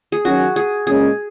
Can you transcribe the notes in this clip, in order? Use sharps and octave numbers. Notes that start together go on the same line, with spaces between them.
G#4
D#3 F#3 C#4 F#4
G#4
A#2 G#3 C#4 G#4